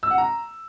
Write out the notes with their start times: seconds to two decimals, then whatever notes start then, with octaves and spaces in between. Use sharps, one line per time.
0.03 E6
0.10 F#5
0.18 A#5